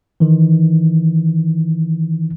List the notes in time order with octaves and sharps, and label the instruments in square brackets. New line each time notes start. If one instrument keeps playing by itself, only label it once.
[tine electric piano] D#3 E3